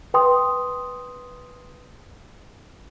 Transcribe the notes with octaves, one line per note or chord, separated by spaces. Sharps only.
B4 G5 C6 D#6